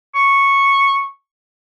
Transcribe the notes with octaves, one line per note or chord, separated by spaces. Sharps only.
C#6